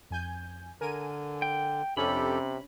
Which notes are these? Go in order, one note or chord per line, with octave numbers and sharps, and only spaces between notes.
F2 G#5 G6
D3 A#4 G#5 D#7
G5
F2 C3 C#4 D4 G4 A4 B5